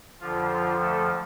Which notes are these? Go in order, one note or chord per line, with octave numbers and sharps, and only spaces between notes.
F2 D3 F3 F4
F4
A3 A4